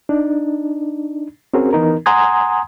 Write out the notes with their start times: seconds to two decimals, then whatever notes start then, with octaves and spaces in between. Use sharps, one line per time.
0.09 D4 D#4
1.54 C4 C#4 F#4 G#4 A#4
1.73 E3 B3 D#4 A#4
2.06 F#5 G#5 A#5 C6 D#6 G#6